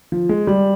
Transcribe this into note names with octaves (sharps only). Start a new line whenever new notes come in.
F3
G#3
G3